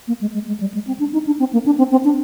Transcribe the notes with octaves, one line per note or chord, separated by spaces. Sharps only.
A#3
G#3
G#3
G#3
G3
G#3
C4
D4
D#4
D4
C4
A#3
D4
C4
C4
D4